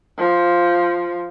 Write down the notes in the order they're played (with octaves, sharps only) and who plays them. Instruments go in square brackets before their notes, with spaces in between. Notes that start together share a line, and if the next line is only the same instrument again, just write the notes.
[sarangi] F3